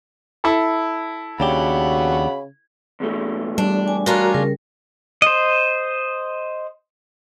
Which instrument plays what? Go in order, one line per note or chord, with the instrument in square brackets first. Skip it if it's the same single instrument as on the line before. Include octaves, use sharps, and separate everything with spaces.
[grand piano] E4 A4
[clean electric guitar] D#2 D4 G4 [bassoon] C#3 [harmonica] F#4 F#5 B5
[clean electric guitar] E2 B2 A3
[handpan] G3 [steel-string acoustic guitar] D4
[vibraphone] G#5
[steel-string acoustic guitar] C#4 D4 F4 [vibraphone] F#4 A#4 A#5
[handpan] C#3 [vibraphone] A#4
[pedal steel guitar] C5 D#5